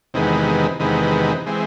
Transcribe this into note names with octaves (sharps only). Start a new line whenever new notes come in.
E2 C3 D#3 G#3 B3
E2 C3 D#3 G#3 B3
E3 G#3 C4